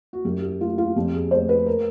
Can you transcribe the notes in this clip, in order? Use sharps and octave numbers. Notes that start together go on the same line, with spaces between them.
F#4
F#2 G4
G4
A3 F4
F4
F2 G4
G#4
A3 C5
B4
A#4